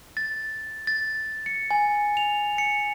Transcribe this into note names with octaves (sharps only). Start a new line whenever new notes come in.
A6
A6
C#7
G#5
F7
C#7